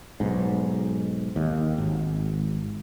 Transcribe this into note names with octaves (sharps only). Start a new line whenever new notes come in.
B1 G#2
D#2
G#1